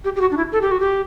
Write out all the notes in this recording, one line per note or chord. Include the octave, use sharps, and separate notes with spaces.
G4
G4
F#4
D4
E4
A4
G4
F#4
G4